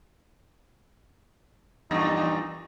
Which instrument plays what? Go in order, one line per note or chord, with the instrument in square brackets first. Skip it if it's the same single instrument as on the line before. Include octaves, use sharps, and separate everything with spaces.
[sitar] E2 G2 A#2 [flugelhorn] D#4